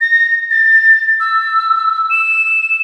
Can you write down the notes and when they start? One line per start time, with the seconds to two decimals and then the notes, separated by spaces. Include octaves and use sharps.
0.01 A#6
0.51 A6
1.20 E6
2.10 E7